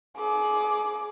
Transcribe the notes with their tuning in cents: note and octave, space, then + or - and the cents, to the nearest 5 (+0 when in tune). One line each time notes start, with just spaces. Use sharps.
G#4 +30 D6 +0